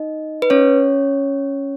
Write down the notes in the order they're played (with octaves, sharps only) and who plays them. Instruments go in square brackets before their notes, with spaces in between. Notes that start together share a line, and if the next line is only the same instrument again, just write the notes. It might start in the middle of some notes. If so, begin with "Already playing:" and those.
Already playing: [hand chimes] D#4 D#5
B4
C#4 C#5